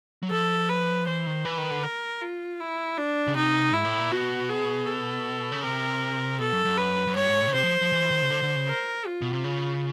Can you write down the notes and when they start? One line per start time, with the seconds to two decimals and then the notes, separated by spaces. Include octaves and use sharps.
0.23 F#3
0.31 F3 A4
0.69 B4
1.07 E3 C5
1.27 D#3
1.45 E3 B4
1.58 D#3
1.71 D3
1.83 A#4
2.21 F4
2.60 E4
2.97 D4
3.27 C#3
3.35 C3 D#4
3.71 G#2 E4
3.84 A2
3.98 A#2
4.11 B2 F#4
4.49 G#4
4.87 A4
5.52 C#3
5.64 C3 A#4
6.40 B2 A4
6.53 F#2
6.65 F#2
6.77 B4
7.07 F#2
7.16 G2 C#5
7.29 G#2
7.41 A2
7.47 C#3
7.54 C3 C5
7.63 F3
7.82 F3
7.92 E3
8.11 D#3
8.22 C#3
8.30 D3
8.43 D3
8.56 C#3
8.69 A#4
9.07 F4
9.22 B2
9.33 C3
9.44 C#3